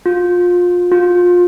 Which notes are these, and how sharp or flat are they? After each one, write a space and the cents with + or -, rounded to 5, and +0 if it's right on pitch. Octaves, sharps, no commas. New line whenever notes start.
F4 +25
F4 +25